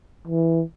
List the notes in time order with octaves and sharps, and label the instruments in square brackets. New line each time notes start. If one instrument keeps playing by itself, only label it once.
[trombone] E3